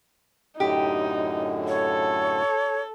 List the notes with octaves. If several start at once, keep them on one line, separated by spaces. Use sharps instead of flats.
F#2 A2 D3 D#4 G4
A4 C#5